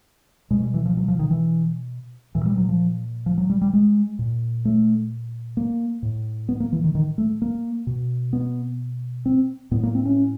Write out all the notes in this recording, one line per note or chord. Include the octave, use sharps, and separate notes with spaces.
B2 G#3
G3
E3
F3
F#3
F3
D#3
E3
A#2 E3
G3
F#3
F3
F3
F#3
G3
G3
G#3
A#2
A3
A#3
A2
B3
A#3
E3
D#3
D#3
A3
A#3
B2
B3
C4
A2 B3
A#3
C4
C#4